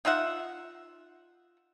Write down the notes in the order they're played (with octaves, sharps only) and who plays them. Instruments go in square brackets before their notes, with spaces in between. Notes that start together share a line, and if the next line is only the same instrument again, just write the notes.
[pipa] D#4 F4 E5 F#5